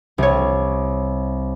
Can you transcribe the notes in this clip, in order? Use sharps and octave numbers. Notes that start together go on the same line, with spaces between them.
C2 C#5